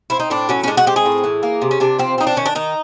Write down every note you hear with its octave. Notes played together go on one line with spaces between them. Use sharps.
C4 E4
D#4
A2 D4
F#3 C#4
C#4
G#3 D4
F#4
C4 G4
G#4
A2
E3
A#3
C3
C#4
C3 D4
F3 C4
C4 D#4
D4
D#3 C#4
D4
D#3 D#4